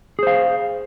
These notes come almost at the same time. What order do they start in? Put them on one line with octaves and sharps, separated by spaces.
G#4 C5 F5